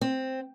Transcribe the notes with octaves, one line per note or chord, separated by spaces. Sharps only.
C4